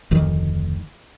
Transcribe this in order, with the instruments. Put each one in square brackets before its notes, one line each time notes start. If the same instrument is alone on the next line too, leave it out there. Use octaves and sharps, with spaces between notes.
[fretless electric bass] F1 D2 D#3